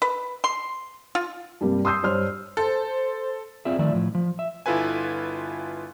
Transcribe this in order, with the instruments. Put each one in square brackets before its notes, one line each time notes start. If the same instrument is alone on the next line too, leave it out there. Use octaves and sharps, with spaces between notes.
[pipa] B4
C6
F4
[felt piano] G2 C3 G3 A#3
C6 D#6 E6 G6 C7
G2 C5 C#5 F6
[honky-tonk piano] A4 [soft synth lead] C5
[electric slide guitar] C4 F4 G#4 D5 E5
D#3 F3 A3 D5 E5
A2 F3
F3
E5
[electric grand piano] G1 E4 F4 A4 B4 G#5